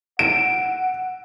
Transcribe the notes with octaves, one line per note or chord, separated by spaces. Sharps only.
F#5 D7